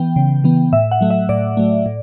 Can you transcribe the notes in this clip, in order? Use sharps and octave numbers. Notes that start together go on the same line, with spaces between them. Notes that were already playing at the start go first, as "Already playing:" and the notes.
Already playing: E3 B3 G5
C#3
E3 B3
A2 E5
F#5
F#3 A3
E5
A2 D5
F#3 A3
A2